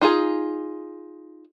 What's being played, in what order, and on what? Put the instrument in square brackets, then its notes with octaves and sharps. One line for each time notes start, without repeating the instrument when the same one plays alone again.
[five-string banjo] D#4 F4 F#4 G#4